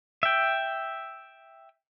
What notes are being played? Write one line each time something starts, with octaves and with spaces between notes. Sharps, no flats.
E5 G5